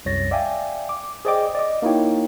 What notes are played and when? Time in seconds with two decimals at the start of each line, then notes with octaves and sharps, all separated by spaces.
0.05 C2 F#2 C#5 A6 A#6
0.31 D5 E5 F5 G5 G#5
0.89 D6
1.25 G#4 C5 D5 D#5 G5 D6
1.55 D5 D#5 D6
1.82 A#3 D#4 E4 F#4 C#5 G5